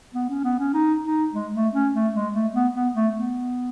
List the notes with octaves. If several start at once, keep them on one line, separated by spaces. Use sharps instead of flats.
B3
C#4
B3
C#4
D#4
D#4
G#3
A3
C#4
A3
G#3
A3
B3
B3
A3
B3